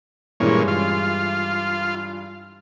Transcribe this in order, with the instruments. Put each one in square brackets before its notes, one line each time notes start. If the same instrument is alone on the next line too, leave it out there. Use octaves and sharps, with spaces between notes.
[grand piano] G2 E3 G#3 [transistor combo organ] A#2 C#4
[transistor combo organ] F4